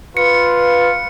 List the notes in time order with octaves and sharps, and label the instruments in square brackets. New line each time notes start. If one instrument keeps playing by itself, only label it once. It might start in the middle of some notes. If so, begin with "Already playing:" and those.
[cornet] F4 [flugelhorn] B4 [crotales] C#7